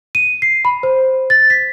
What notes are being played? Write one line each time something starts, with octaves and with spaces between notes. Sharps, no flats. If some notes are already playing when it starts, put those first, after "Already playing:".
D#7
C7
B5
C5
A6
B6